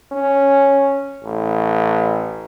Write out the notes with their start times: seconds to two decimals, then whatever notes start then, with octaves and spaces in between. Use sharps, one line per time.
0.12 C#4
1.23 A1